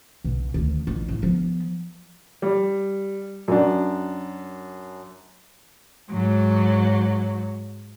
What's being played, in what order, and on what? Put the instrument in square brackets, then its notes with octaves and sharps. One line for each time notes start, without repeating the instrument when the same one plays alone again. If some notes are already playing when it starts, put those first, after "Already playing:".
[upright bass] B1 B2
D2 D#3
A1 F4
F#2 A2
F3 B3
[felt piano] G3
F#2 D4
[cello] G#2 F#3